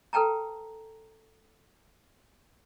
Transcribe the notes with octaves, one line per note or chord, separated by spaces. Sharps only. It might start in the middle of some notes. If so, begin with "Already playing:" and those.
A4 B4 G5 A5 A#5